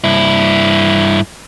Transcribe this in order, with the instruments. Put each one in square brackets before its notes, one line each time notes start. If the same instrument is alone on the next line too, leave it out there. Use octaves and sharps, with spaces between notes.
[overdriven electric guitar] G2 E4